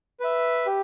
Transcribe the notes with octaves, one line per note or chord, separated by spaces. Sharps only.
B4 E5
G4